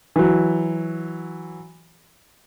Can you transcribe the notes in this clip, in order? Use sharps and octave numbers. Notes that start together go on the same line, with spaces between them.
E3 F#3